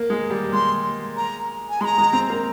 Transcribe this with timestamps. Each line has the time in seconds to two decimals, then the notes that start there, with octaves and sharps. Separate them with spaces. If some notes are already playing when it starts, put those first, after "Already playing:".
Already playing: A#3
0.10 G#3
0.30 G3
0.53 G#3 C6
1.17 A#5
1.70 G#5
1.81 G#3 C6
1.85 A#5
1.98 G#3
2.13 C4
2.30 A#3